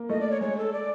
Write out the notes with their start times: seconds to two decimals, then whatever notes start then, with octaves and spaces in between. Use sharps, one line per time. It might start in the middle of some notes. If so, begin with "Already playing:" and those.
Already playing: A#3
0.09 A3 D#5
0.20 D5
0.31 C#5
0.41 G#3 C#5
0.57 A4
0.73 D5